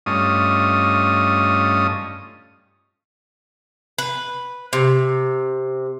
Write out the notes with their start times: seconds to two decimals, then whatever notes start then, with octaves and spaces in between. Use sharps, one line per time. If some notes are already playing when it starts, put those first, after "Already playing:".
0.06 G2 A3 C#4 F4 D#5 D#6
3.98 B4
4.73 C3